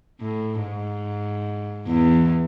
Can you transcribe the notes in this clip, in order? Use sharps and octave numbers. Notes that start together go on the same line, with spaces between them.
A2
G#2
E2